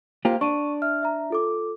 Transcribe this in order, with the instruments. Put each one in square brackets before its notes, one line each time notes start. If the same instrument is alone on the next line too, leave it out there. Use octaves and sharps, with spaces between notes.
[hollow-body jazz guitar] A#3 F4 G4 [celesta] C5
[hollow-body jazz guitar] D4 [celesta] C#6 D#7
[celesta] E5 F6
E5 A#5
F4 A4 D6